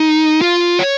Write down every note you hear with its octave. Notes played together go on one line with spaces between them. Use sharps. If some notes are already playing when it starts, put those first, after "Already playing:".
Already playing: D#4
F4
C#5